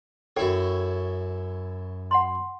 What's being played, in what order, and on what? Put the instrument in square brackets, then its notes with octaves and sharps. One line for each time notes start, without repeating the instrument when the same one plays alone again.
[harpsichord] F#2 E4 C#5 [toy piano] A4 G5
[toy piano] F#5 B5 C6